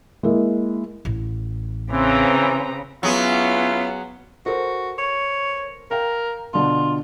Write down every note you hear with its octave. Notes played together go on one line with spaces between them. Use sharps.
G#3 A#3 E4
A1
C#3 E3 C4 B4 A#5
F#3 B3 C#4 E4 F4 G#4
F#4 A4 A#4 C5
C#5
A#4 F5 G5 A#5
B2 D3 D4 F4